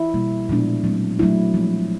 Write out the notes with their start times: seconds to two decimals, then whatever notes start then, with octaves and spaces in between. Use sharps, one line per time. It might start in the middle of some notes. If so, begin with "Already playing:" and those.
Already playing: E4
0.14 B2 G3 A#3
0.49 A#2 F3 G#3 B3 D4
0.84 F#3 A3 C4
1.19 F#3 A3 D4 E4
1.54 F3 G#3 C4